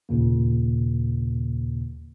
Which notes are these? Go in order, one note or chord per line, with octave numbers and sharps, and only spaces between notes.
D#2 A#2 C#3 A#3